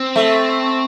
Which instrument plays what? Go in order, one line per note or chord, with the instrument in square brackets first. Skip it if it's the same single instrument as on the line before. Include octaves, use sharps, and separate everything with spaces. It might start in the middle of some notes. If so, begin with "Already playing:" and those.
Already playing: [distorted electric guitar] C4
[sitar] A3